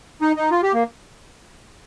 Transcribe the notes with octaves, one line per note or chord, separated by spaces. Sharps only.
D#4
D#4
F4
G4
A#3